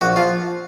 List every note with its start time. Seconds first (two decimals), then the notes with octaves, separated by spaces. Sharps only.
0.01 A#1 F#4
0.16 F3 F4